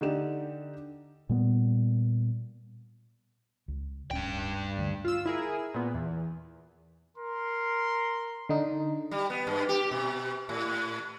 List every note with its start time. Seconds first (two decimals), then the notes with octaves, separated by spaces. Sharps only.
0.01 D3 D#4 G4 D5 E7
1.29 A#2 G3 B3
3.68 C#2
4.11 D1 G2 C#4 G5
4.78 D2 D3
5.05 F4 E6
5.26 E4 G#4 A#4
5.74 A#2 B3
5.94 E2
7.17 A#4 C6
8.49 D3 D#4
9.11 G3
9.30 B3
9.47 G2
9.69 G4
9.91 B2
10.49 A2